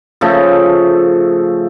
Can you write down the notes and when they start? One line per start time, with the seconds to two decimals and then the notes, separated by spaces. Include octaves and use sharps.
0.21 C#3 F3 A3 A4